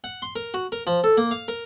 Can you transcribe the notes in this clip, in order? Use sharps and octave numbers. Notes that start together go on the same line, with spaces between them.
F#5
C6
A#4
F#4
A#4
F3
A4
A#3
F5
A#4